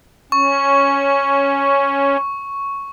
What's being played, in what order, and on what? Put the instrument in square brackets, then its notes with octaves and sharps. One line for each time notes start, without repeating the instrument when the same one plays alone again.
[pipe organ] C#4 [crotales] C#6